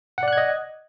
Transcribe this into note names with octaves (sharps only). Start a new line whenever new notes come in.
D5 D#5 F#5 F#6 G#6